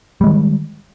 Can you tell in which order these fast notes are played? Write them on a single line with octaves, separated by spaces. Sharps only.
G3 G#3 D#3